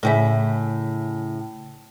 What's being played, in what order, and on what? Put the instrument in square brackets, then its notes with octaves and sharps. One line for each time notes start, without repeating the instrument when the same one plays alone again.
[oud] A2 C#3 E5